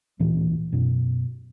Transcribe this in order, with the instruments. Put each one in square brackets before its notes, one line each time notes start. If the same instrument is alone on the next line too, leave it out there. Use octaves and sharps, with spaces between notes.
[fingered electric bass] A1 D2 A#2 E3
F#2 B2